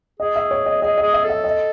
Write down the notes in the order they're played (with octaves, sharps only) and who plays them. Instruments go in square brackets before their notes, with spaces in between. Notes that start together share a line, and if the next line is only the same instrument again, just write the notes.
[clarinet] G#4 [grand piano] D#5
[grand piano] E5
C#5
D#5
[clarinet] G#4 [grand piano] D#5
[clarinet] G#4 [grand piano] D#5
[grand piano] E5
[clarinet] A4 [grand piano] E5
[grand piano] D#5